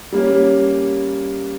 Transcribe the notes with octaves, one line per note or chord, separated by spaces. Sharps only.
G3 A#3 C#4